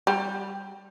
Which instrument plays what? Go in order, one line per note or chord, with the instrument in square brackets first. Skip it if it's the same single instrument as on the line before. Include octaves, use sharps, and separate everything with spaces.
[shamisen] G3